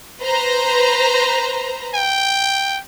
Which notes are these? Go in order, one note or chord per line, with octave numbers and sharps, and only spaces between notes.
B4 C5 A#5
G5